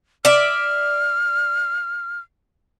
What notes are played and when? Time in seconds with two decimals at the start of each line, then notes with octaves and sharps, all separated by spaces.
0.25 D5 E5 F6